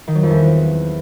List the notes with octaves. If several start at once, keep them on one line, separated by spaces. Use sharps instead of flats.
D#3
F#3
F2
E2